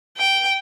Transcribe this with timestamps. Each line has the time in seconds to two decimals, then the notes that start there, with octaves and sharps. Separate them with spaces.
0.17 G5